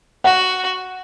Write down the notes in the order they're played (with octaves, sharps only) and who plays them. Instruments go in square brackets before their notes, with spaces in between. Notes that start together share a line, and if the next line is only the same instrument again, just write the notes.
[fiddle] F#4 [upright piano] F#5